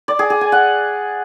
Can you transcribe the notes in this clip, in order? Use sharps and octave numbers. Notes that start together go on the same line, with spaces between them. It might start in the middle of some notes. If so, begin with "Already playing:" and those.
D5
G#4
G#4
G#5
F#5